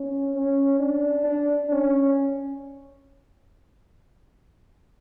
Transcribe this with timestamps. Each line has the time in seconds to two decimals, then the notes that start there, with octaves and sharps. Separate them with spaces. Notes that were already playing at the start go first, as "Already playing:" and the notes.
Already playing: C#4
0.35 C#4
0.80 D4
1.26 D4
1.71 C#4